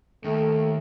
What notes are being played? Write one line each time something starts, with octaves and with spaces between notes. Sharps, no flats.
D#2 A3